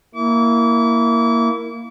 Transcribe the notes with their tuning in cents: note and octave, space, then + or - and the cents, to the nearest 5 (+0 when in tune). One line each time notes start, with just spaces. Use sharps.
A#3 +0 E4 +0 D6 -40